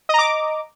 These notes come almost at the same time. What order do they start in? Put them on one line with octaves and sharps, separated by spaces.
D#5 A#5 D6